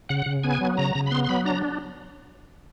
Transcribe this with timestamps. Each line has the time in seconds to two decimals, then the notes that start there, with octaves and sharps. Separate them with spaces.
0.09 C#3 F#5
0.26 C#3
0.43 B3 G#5
0.61 F#3
0.77 C#3 A#5
0.95 C#3
1.06 B5
1.11 B3 C6
1.24 C6
1.29 F#3 B5
1.45 D4 A#5